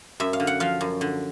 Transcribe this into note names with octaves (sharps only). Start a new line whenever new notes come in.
F#2 E5
F5
D3
F#5
F3 F5
F#2
D3